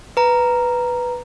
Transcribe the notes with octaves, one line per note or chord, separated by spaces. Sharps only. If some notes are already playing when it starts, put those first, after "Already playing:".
B4 A#5